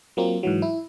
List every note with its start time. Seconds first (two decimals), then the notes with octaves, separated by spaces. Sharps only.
0.17 F#3 A#3 C4 F4
0.43 G#2 E3 F#3
0.62 E4